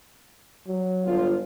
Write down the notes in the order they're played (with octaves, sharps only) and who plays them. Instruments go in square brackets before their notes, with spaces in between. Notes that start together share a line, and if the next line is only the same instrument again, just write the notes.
[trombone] F#3
[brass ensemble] G1 F4